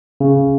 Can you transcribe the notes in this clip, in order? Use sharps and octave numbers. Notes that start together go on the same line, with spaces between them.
C#3